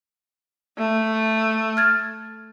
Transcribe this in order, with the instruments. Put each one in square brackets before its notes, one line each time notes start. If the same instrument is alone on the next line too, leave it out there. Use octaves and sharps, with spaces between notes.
[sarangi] A3
[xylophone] F6 G#6 A6